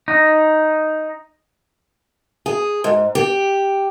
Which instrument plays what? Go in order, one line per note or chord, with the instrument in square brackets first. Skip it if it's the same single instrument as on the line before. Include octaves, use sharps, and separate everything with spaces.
[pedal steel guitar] D#4
[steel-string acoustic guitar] G#4
G#2
G4